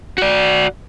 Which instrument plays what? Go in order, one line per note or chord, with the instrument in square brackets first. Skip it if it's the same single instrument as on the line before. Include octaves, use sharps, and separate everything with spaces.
[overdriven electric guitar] F#4 D5